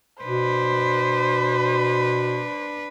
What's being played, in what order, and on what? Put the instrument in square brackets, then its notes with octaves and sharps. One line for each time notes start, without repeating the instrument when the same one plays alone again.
[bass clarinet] B2 [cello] D4 B4 [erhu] C5